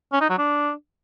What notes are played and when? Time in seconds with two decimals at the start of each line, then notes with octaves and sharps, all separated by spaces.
0.12 C#4
0.21 D#4
0.29 F#3
0.38 D4